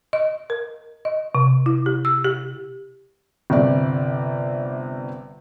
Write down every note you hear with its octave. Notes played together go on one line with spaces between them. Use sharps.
D#5
A#4
D#5
C3
E4
G4
E6
G4
G1 C3 D5